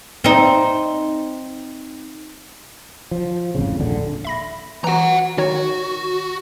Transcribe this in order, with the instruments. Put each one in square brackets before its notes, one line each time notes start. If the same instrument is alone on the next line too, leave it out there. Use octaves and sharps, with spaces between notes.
[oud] C4 D#4
[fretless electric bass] F3
G#1 F2 A2 C#3
D#1 A#1 D3
[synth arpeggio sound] E5 B5 A#6
[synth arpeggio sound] E3 F#4 [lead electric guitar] F#5 A#5
[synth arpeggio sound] D#3 D#4 C#5 [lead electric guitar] F#4